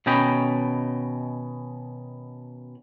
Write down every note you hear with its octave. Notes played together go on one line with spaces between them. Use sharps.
B2 D#3 C#4 D#5 G5 B5